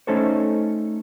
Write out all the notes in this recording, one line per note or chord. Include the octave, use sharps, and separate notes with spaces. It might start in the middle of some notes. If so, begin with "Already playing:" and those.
A3 C#4 D#4 A4 C5 C#5